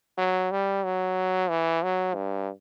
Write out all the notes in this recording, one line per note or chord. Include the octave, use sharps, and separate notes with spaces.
F#3
G3
F#3
E3
F#3
G2